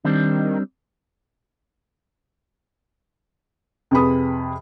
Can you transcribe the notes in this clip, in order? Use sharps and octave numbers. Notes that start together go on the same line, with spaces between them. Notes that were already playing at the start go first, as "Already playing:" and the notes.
D#3 G3 C4 D4
F2 C3 G#4 B4 B5 D#6